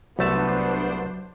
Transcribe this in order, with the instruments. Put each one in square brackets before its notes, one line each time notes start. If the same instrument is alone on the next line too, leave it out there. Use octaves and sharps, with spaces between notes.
[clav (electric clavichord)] C2 A3 A5 [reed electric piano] F#3 [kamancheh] B3 [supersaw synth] D4 C5